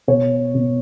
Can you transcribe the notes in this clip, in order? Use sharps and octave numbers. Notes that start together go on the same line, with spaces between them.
B2 C#5
B2